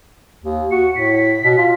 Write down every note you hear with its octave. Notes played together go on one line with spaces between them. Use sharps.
D#2
F#4 C#7
A2 B6
B2
F4